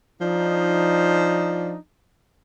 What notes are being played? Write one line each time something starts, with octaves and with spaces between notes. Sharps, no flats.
F3 D4 D#4